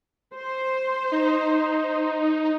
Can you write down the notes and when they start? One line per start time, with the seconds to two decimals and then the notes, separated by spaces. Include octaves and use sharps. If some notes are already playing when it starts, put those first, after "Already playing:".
0.35 C5
1.12 D#4